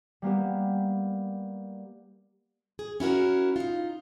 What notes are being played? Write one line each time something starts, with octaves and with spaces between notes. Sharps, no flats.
G3 A#3 B3 G4
G#4
C#4 E4 F#4 A#4
D#4 F4